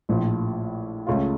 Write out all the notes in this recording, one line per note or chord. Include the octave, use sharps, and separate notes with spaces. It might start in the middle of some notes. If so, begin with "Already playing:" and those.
A#1 A2 F3
C#2 C#3 A3 C#4 F4